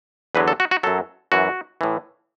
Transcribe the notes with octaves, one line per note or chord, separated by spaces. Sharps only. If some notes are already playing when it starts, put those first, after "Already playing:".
E2 D3 F#3 B4
A4
F#4
F#4
F#2 F#3 A4
F#2 E3 F#4
A2 E3